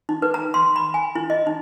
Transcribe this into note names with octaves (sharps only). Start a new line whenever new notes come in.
D#4
B4
A#5
C6
B5
G#5
E4
D#5
D#4